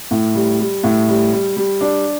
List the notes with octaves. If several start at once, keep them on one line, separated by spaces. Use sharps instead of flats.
A2
G3
G3
A2
G3
G3
G3
D4